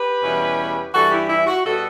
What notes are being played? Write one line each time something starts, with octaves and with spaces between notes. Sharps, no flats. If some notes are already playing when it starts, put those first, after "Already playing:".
Already playing: G4 B4
E2 B2 G3 C#4 E4
G2 E3 G3 F#4 A4
E4 G4
E4
F#4
B2 G3 B3 F#4 A4